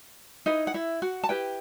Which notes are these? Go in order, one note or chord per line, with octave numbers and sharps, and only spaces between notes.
D#4 E4 B4 D#5
F#5
E4 E5
F#4 F#5
A5
E4 G4 B4 G5